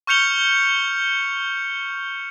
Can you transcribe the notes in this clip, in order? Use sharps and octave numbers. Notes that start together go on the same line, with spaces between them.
C#6 F6 G6 C#7 F7 G7